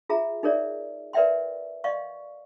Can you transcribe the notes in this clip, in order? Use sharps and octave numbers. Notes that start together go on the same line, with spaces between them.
F4 G#4 E5 A#5
D#4 G#4 A#4 C#5 D5 E5
A#4 B4 D5 E5 G5 C6
D5 D#5 F5 C6 C#6